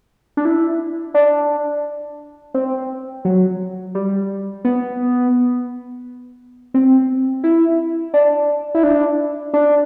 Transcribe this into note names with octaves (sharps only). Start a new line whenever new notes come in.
D4
E4
D4
C4
F#3
G3
B3
C4
E4
D4
E4
D4
D4